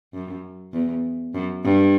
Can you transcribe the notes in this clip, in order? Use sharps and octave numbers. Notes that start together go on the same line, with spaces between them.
F#2
E2
F#2
G2